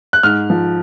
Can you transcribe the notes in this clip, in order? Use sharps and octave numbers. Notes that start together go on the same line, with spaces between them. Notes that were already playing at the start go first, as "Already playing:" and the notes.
F#6
G#2 F6
F3